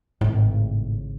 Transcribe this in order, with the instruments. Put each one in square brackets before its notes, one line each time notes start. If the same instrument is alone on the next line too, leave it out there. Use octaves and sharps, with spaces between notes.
[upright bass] G#1 C#3 [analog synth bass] A2